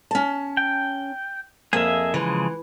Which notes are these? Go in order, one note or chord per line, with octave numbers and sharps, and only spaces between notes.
C#4 A5
G5
F2 A#3 G#4 E5
C#3 E3 F3 G#3